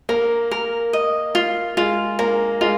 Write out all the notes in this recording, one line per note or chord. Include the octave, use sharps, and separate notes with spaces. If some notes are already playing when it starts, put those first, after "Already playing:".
A#3 A#4
A#4
D#5
F4
G#3 F4
A#3 A#4
G#3 F4